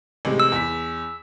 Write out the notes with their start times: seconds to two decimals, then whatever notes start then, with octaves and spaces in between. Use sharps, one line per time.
0.25 A1 C3 G#3
0.40 E6
0.52 E2 B6